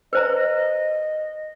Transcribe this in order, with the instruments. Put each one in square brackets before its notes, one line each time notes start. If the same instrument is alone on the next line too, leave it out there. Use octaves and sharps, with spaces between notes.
[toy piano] B4 C5 A#5 [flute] D#5